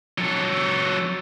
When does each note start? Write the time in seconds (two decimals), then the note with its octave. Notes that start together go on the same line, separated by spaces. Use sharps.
0.18 F#3 A4